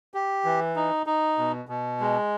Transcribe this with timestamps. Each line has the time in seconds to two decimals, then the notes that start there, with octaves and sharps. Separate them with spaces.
0.14 G4
0.45 E3
0.76 D#4
1.06 D#4
1.38 B2
1.69 B2
2.00 G#3